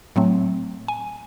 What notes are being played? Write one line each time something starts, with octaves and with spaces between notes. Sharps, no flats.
A2 F#3 A3 C4
G#5